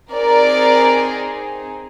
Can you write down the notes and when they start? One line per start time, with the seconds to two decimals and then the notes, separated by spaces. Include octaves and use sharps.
0.11 C4 D#4 G#4 A#4 D5